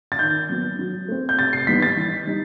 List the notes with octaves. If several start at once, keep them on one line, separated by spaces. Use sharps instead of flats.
A6
D#3 G6
F#3 B3
F#3
A3 C4
G6
C3 A6
C7
E3 G3 B3 D#4 B6
A6
E3
G3 D#4